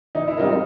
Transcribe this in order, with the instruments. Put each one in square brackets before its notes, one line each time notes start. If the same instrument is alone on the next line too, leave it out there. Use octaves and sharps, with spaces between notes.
[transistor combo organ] E3 [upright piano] D#4
[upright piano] E4
[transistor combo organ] G3 C4 F4 A#4 [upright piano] D#4